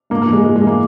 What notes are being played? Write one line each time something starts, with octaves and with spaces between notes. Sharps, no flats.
G#2 A#3
A#3
E3
G#3
G#2 G#3
G#3
E3
A#3